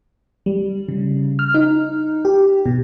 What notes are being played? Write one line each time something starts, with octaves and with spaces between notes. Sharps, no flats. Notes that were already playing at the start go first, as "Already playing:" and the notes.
G3
C#3
F6
D#4
G4
B2